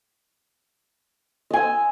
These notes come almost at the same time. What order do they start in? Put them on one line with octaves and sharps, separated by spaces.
D#5 G#5 E6